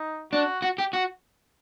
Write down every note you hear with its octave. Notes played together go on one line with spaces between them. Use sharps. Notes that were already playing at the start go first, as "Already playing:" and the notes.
Already playing: D#4
D4 F#4
F#4
G4
F#4